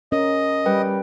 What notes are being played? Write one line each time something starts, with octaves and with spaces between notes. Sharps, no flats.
C#4 A#4 D#5
G3 B4 G5